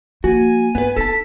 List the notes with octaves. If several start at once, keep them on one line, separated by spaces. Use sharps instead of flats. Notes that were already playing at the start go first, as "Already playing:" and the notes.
F3 A#3 F#4 G#5
G2 B3 B4
B3 D#4 A4 A5 B6